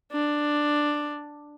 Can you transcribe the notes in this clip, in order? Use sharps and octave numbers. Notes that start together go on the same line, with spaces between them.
D4